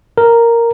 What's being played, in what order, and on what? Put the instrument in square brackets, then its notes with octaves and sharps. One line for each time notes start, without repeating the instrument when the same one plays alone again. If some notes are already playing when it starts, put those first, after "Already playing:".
[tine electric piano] A#4